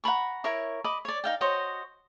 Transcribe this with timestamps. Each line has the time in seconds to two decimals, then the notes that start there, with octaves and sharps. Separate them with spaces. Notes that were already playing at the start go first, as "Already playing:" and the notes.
0.04 F#5 A#5 B5 C#6
0.44 E4 A#4 C#5 C#6
0.84 D#5 B5 D6
1.05 C#5 D5
1.24 D#4 F5 G5
1.41 F#4 C5 C#5 D#5